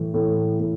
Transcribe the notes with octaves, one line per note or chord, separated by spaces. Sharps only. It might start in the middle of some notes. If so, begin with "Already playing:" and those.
Already playing: A2 E3
A2
A2